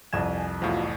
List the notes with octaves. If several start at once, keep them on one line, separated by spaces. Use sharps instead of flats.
C2 F2 G#5 A5 E7
E2 A2 F3 F#4 F5